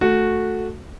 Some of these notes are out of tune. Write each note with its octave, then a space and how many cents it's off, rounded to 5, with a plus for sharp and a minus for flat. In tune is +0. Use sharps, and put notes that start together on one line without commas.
A3 +0 F#4 -10